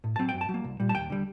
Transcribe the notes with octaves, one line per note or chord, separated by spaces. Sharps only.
A2
F#3 C4 A5
G5
F#2
A5
F#3
A#3
C2
A#2 G3
A5
D#2 G5
D3 G3